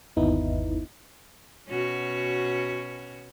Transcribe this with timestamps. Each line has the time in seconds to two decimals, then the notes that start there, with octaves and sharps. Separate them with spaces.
0.16 G1 D#2 B3 D#4 E4
1.68 B2 C#4 F#4